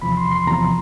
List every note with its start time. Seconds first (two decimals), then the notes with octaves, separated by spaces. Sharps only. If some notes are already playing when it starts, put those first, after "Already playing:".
0.02 E2 C3 F3 B5
0.17 C6
0.32 C6
0.47 E2 C3 F3 A#5